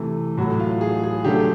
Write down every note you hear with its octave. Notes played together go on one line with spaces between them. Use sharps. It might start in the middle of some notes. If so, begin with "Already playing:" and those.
Already playing: C3 E3 A3
A2 F#3 A3 F#4
F4
G#4
G#4
D3 F#3 A3 G4